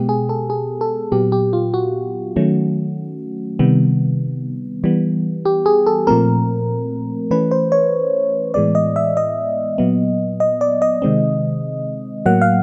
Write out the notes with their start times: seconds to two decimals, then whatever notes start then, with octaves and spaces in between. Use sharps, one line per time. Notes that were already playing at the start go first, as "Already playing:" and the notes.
Already playing: B2 G#3 B3 G4
0.09 G#4
0.29 A4
0.50 G#4
0.81 A4
1.12 A#2 F#3 B3 G4
1.32 G4
1.53 F4
1.74 F#4
2.36 D#3 F#3 A3 C#4
3.59 C3 D#3 G3 B3
4.84 E3 G3 B3
5.45 G4
5.66 G#4
5.87 A4
6.07 A#2 F3 A3 C4 A#4
7.31 E3 A3 C#4 B4
7.51 C5
7.72 C#5
8.54 A2 E3 G#3 B3 D5
8.75 D#5
8.96 E5
9.17 D#5
9.78 A#2 F#3 B3
10.40 D#5
10.61 D5
10.82 D#5
11.02 C3 D#3 G#3 C4
12.26 A2 F#3 A#3 F#5
12.41 F5